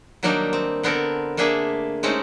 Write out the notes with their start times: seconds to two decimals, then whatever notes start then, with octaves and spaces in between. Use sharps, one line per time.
0.23 D#3 F#3 G3 A#3 D4 D#4
0.53 C4
0.83 D3 B3 C4 A4 A#4
1.37 A3 A#3 D4 G#4 E5
2.03 G#3 A3 C4 C#4 D#4